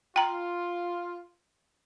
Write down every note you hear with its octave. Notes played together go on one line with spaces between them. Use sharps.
F4 G5 A#5